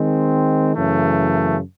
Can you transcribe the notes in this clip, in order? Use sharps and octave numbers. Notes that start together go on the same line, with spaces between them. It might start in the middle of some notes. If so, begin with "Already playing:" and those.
Already playing: D#3 G#3 C4
F#2 C#3 E3 A3